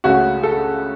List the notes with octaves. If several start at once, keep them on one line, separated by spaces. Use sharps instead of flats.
C#2 C#3 A3 C#4 F#4
A4